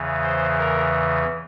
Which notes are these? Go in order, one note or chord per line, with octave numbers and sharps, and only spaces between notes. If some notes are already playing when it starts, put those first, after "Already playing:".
Already playing: E2 C#3 E3
C5
A#4